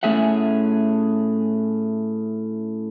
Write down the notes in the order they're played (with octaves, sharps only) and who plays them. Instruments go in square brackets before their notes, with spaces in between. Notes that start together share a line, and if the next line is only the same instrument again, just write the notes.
[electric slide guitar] A2 A3 C#4 G#4 E5 F#5